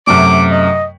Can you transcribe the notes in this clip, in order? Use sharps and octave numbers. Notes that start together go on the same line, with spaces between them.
F#2 C3 A3 D6
D#5